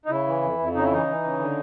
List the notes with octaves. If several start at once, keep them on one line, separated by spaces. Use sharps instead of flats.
D#4
C#3 E4
E3
F2
F2
C#3 D#4
E4
E3 D#4
E3
C#3
D3